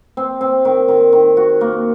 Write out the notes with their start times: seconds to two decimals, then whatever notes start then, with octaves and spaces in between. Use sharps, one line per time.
0.17 C4
0.41 C4
0.65 D#3
0.88 D#3
1.13 D#3
1.37 F#4
1.61 A#3